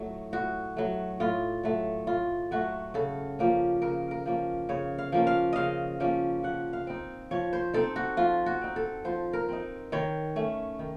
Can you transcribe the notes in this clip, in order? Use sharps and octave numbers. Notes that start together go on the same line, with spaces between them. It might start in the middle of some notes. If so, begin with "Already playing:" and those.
Already playing: A2 F#3 A3
A2 F#4
F#3 A3
A2 F4
F#3 A3
A2 F4
F#3 A3 F#4
C#3 A4
F3 A#3 C#4
C#3 A#4
A#4
F3 A#3 C#4
C#3 C#5
F5
F3 A#3 C#4
F5
C#3 D#5 F5
F3 A#3 C#4
F3 F#5
F5
C4 D#4
F3 C#5
C5
C4 D#4 A4
F#4
F3 F4
F#4
C4 D#4
A4
F3 C5
A#4
C4 D#4
D#3 C#5
A3 C#4
D#3